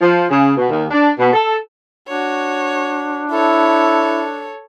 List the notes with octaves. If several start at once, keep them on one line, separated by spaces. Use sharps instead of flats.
F3
C#3
B2
D#2
D4
B2
A4
D4 F#4 C#5
E4 A4 C#5